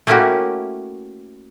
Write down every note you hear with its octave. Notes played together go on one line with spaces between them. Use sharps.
A3 A#3 C#4 E4 F#4 G4